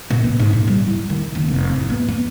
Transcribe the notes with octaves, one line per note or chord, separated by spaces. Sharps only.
A#2
B3
G#2
A#2
G3
E4
D#3
F#1
F1
A1
B3
B3